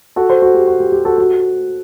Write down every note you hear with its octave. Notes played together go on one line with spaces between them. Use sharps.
F#4 A4
A4 C5
F#4
G4
F#4
G4
G4
F#4 A4
F#4